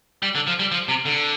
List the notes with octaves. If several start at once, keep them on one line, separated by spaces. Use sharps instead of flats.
G3
D3
F3
G3
F3
C3
D3